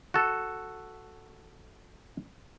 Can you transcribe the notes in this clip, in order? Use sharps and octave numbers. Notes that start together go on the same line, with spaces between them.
F#4 A4